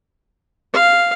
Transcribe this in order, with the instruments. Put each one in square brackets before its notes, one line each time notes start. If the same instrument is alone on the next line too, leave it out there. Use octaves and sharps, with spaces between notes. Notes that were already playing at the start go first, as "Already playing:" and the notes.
[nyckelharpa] F5